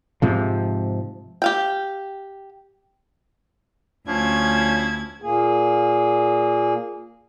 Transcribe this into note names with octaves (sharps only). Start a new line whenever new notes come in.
G#2 C3 F3
G4 F5 G5
D2 F3 C#4 E4 G#6
A#2 A#3 G#4